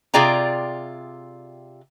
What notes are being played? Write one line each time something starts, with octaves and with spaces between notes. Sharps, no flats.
C3 F4 G#4 D5 G5 A#5